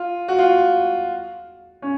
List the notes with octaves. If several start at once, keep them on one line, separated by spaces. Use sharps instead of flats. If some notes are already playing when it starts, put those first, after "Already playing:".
Already playing: F4
F#4
F4
C#4